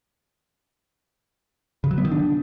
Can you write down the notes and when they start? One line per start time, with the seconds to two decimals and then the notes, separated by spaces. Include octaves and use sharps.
1.84 C#3
1.91 F#3
1.98 B3
2.05 D#3
2.12 D4